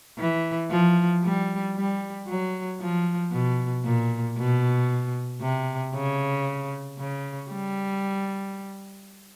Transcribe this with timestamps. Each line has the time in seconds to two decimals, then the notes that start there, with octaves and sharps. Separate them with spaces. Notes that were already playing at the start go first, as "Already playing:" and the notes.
0.19 E3
0.71 F3
1.23 G3
1.76 G3
2.28 F#3
2.81 F3
3.32 B2
3.85 A#2
4.38 B2
5.41 C3
5.94 C#3
6.99 C#3
7.51 G3